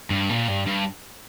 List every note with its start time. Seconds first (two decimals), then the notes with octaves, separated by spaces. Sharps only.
0.10 G2
0.29 A#2
0.48 G2
0.66 G2